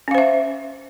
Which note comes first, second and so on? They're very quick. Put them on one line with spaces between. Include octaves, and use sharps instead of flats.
C#4 F5 C5 E5